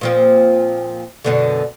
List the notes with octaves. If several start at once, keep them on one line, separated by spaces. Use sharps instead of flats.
A#2 F3 C4
F#2 B2 D3